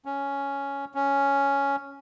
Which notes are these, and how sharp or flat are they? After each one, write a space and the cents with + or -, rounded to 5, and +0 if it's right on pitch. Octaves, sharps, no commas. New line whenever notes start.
C#4 +5
C#4 +5